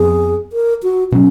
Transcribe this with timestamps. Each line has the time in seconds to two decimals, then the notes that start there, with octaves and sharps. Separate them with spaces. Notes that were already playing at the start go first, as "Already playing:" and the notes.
Already playing: F2 F3 B3 G#4
0.53 A#4
0.83 F#4
1.12 B2 F#3 C#4